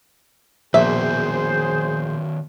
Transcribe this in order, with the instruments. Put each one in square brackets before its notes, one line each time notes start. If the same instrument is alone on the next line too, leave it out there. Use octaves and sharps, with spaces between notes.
[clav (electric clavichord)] A#1 [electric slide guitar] D#3 B3 F#4 [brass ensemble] G#4 C5 [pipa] E5